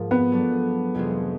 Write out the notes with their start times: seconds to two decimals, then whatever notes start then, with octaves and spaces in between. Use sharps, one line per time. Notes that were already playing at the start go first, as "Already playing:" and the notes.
Already playing: G#2 F3 A#3
0.11 B3
0.31 F#3 A3 D4
0.94 F2 C3 E3 G#3